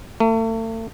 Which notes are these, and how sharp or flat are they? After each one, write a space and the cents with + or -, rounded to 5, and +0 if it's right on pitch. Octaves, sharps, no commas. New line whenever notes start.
A3 +40